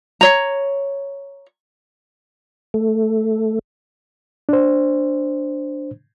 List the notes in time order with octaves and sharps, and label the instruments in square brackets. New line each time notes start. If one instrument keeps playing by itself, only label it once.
[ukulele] C#5 A#5
[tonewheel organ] A3
[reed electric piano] D4 C5